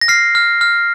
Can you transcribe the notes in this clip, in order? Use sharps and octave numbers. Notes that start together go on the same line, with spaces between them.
A#6
F6 C7
F6
F6